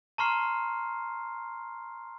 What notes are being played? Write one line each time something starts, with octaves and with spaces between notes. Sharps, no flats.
A5 A#5 C6 C#6 F6 C7